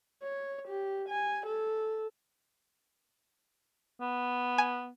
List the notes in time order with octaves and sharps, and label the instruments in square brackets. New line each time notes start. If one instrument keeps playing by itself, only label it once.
[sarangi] C#5
G4
G#5
A4
[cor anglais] B3
[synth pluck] G#5